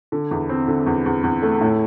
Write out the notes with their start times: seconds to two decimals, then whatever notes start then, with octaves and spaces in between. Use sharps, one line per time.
0.12 D3
0.31 E2
0.49 C4
0.68 D3
0.86 E2
1.06 E2
1.24 E2
1.42 A3
1.61 A2